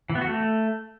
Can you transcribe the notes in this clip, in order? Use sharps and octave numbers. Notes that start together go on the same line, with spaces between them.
E3
B3
F#4
A3